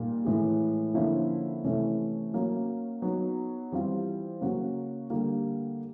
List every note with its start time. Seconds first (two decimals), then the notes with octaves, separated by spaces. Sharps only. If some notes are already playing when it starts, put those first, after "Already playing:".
Already playing: A#2 G3 A#3 D#4
0.25 A2 E3 G#3
0.94 D3 F3 A#3 C#4 E4
1.63 C3 E3 A3 C#4 E4
2.33 F#3 A#3 C#4
3.02 F#3 B3 D#4
3.72 E3 G3 C4 F4
4.41 C#3 F#3 A#3 C#4 F#4
5.10 D3 G3 A#3